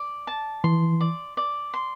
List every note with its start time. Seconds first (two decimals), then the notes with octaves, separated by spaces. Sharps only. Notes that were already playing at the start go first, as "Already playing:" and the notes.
Already playing: D5
0.27 A5
0.64 E3 C6
1.01 D5
1.37 D5
1.74 C6